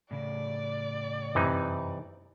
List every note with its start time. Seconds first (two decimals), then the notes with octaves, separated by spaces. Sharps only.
0.11 A2 C#3 D5
1.35 F#2 C3 E3 D#4